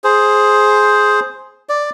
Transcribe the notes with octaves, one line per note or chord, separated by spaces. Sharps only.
G#4 C5
D5